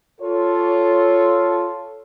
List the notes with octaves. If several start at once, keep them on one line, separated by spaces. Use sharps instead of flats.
F4 A4 C#5